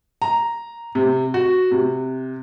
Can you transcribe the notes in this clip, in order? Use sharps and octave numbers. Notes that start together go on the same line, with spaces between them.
A#5
C3
F#4
C3